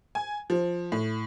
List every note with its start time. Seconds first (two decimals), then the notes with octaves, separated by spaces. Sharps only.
0.15 G#5
0.50 F3
0.92 A2